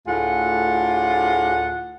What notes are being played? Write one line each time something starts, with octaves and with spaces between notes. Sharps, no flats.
D2 A2 F4 G#4 F#5